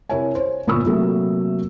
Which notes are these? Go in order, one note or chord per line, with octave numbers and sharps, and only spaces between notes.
C3 E4 A#4 C#5 E5 G#5
C5 C#5
G1 A#2 B5 C#6 D#6 E6
C3 F#3 A3 A#3